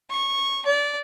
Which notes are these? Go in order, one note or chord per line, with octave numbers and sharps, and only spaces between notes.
C#6
D5